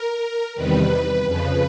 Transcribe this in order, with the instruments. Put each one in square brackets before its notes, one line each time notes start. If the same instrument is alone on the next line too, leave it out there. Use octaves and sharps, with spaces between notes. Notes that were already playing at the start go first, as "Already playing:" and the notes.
Already playing: [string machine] A#4
E2 C3 D#3 G3 B4
F2 C#3 F3 B4